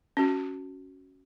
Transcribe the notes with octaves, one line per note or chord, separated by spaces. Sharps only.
C#4 F#4